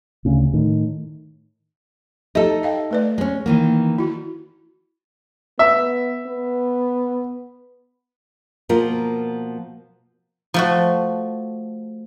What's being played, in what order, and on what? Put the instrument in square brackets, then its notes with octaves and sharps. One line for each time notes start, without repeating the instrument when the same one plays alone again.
[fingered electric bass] D2 C#3
A2 D#3
[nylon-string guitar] D#4 A4 [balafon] G4 D#5 E5
[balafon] D#5 F5 G5
A3 B4 D5
[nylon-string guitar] G#3 C#4
D#3 E3 A#3
[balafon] E4 F#4
[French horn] B3 [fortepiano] E5
[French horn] B3
[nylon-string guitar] B2 F3 A#3 F4 A#4
[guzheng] F3 A3 F#4